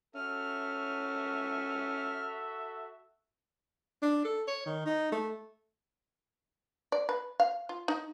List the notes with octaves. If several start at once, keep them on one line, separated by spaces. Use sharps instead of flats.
C#4 F#4 A4 E5 F6
D4
A4
C#5
D#3
D#4
A3
D5
B4
F5
F4
D#4